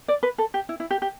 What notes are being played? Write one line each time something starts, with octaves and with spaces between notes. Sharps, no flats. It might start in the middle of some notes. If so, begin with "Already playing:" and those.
D5
B4
A4
G4
E4
E4
G4
G4